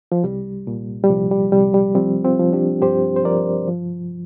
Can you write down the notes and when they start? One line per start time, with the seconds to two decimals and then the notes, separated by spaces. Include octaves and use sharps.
0.12 F3
0.24 C2 G3
0.67 A#2
1.04 G3
1.10 C2 F3
1.31 G3
1.52 C2 G3
1.74 G3
1.95 F3 G3 C4
2.24 C4 F4
2.39 F3
2.53 D4 G4
2.82 G2 G4 C5
3.16 C5
3.24 F3 A#4 D5
3.68 F3